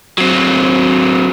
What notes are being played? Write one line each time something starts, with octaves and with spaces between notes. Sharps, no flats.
F#3 C4